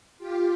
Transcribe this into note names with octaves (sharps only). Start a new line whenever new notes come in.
F4 G4